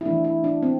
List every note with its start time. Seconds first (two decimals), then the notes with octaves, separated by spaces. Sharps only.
0.01 E4
0.05 E3 A3 D4
0.24 E4
0.44 D4
0.63 C4